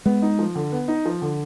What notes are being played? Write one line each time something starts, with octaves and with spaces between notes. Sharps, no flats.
G#3 B3
D#4
F3
D3
B3
D#4
F3
D3